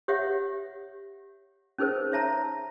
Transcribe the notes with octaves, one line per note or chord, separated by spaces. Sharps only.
G4 C#5 E5 F#5
C#4 D#4 G#4 A#4 C5
C#5 E5 A5 A#5